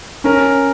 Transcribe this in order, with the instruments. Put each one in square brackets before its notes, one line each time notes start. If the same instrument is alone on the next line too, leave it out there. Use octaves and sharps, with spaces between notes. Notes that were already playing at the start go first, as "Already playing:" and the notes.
[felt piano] C#4 [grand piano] A#4